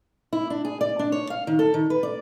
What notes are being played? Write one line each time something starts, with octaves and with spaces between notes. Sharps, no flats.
E4
D4
G#4
D5
D4
C#5
F5
D#3
A4
D#3
B4
D5